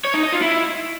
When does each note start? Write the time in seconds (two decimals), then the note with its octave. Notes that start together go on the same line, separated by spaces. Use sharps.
0.05 C#5
0.14 D#4
0.23 D#5
0.32 F4
0.42 E4